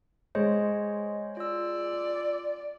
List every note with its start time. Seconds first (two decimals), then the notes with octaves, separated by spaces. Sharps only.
0.35 G#3 C5 C#5 D#5
1.37 F4 D5 E6